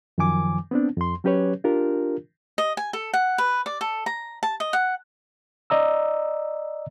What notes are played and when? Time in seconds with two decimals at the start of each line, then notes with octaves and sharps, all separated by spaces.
0.18 F#2 D#3 F3 G#5 D6
0.71 B3 C4 D4
0.97 F2 C6
1.24 F#3 C#4 G4 B4 C#5
1.64 D4 F4 G4 A#4
2.58 D#5
2.77 G#5
2.93 A4
3.13 F#5
3.38 B4
3.66 D5
3.81 A4
4.06 A#5
4.43 A5
4.60 D#5
4.73 F#5
5.70 D5 D#5 A#5 E6